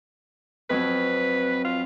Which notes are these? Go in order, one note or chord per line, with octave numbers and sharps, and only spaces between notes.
F2 F#3 C4 B4
F4